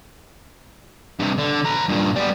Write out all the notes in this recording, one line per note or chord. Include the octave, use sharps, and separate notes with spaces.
G2 C3
D3
B4 A#5
G2 A#2
G3 B3